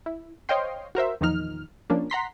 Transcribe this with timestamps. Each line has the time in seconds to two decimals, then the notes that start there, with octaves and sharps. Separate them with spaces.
0.06 E4
0.49 C5 C#5 D#5 F5 G5 C6
0.95 F#4 A#4 C5 E5
1.21 E2 A#2 D#3 F3 D#4 F6
1.90 F3 A#3 C#4 D4
2.10 F#5 A#5 C6 B6